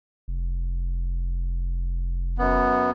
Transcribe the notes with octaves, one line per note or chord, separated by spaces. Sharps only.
F1
F#2 B3